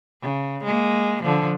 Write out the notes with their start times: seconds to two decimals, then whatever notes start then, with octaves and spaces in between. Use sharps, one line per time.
0.22 C#3
0.64 G#3 A#3
1.23 D3 F3